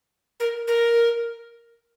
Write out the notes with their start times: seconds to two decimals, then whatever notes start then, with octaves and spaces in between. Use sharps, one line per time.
0.40 A#4
0.68 A#4